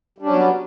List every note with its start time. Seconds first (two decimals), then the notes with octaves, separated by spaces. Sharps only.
0.18 G3
0.22 D4
0.26 C#4
0.30 F#3
0.33 B3